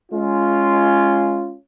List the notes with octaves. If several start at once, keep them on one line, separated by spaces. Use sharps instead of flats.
G#3 C#4 F4